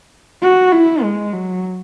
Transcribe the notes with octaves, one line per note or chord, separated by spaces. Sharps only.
F#4
E4
G#3
F#3